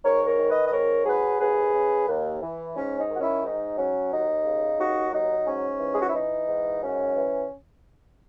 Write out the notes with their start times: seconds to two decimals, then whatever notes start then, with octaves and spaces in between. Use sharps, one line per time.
0.04 G#2 A#4 C#5
0.27 A#4 C#5
0.38 D#3
0.49 B4 D#5
0.65 D#5
0.72 G#2 A#4 C#5
1.06 F#3 G#4 B4
1.40 D#2 G#4 B4
1.73 C#3
2.07 D#2
2.42 E3
2.75 G#2 C#4
2.98 D#4
3.09 D#3
3.16 F#4
3.20 C#4 E4
3.43 G#2 D#4
3.77 F#3 C#4
4.11 D#2 D#4
4.44 C#3
4.78 D#2 D#4 F#4
5.12 F#3 D#4
5.46 G#2 C#4
5.80 E3
5.92 G#4
6.00 F#4
6.07 E4
6.13 E3 D#4
6.48 G#2
6.82 F#2 C#4
7.15 E3